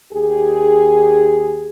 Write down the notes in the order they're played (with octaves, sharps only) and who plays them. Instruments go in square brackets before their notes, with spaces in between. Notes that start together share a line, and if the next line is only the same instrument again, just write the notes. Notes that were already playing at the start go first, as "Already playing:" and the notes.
[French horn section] D#2 G4 G#4